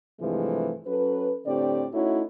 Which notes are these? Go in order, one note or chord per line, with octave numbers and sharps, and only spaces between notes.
G2 C3 E3 F3 G#3 A3
F#3 C#4 A4 B4
A2 D3 C4 G4 D5
A3 C#4 D#4 E4 F#4 C#5